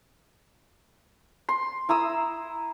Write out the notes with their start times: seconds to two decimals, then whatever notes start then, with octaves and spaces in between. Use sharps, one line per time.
1.49 C6
1.89 E4 A#5 D#6 E6